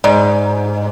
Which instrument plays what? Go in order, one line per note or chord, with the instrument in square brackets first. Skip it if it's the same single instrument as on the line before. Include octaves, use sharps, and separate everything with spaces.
[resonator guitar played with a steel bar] G#2 [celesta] D5